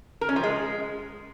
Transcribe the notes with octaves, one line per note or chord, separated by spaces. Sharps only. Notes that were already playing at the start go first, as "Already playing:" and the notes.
A#4
C#4
F3
G#3